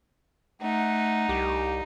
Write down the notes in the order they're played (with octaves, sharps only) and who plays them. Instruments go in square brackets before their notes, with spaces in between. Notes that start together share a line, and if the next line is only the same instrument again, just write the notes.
[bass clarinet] A3 [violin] D#4 [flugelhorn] F#5
[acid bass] C2 [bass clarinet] G4